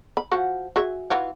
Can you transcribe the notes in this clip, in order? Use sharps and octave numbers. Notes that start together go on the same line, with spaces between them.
B5
F3 F#4 F#5
F#4 G#4 E5
E3 F4 F#4